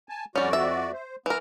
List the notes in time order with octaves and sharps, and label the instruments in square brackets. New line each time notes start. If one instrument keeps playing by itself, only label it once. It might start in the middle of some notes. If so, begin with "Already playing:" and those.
[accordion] G#5 A5
[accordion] F2 F#4 D5 [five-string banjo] G3 C#4
[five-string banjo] E5
[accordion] C5
[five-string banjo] E3 A#4 [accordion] B3